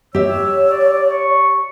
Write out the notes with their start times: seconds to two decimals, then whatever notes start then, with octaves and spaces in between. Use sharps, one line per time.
0.15 G4 C#5 E5 E6
0.71 D5
1.11 C#6